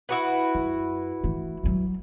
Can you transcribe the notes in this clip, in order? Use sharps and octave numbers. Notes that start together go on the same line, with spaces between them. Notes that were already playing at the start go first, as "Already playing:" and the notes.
E4 F#4 B4
F#2
E3 A3
F#3 G3